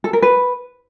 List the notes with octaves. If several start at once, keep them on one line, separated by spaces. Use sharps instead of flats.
A4
A#4
B4